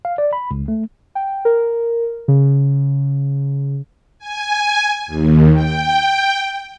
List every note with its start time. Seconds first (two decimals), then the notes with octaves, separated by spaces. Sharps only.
0.05 F5
0.18 D5
0.33 B5
0.51 C#2
0.68 A3
1.15 G5
1.45 A#4
2.28 C#3
4.19 G#5
5.07 D#2
5.53 G5